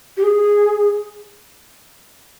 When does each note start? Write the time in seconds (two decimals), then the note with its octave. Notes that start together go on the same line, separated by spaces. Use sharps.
0.17 G4
0.23 G#4